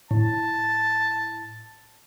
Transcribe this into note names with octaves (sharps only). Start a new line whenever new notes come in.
A2 A5